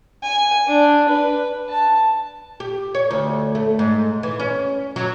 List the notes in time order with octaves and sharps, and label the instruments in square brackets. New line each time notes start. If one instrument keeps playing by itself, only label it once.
[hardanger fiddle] G#5
D4
B4
A5
[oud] G4
C#5
D2
A3
G#2
E3
C#4
F#3